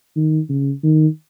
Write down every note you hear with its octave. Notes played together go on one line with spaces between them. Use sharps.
D#3
C#3
D#3